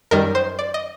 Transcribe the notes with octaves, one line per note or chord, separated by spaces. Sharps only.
F#2 D#3 G3 A#4
C5
D5
D#5